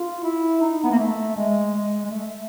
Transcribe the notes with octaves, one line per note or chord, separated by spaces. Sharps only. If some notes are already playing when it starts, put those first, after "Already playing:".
Already playing: F4
E4
D#4
B3
A#3
A3
G#3
G#3
G#3
A3